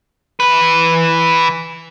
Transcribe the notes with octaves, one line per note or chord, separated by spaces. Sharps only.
E3 B4